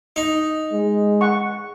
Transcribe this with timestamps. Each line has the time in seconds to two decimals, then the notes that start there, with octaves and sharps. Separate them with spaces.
0.16 D#4
0.72 G#3
1.21 F#5 C#6